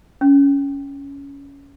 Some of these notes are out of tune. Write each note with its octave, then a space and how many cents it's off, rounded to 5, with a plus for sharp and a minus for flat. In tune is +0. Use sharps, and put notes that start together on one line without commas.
C#4 +15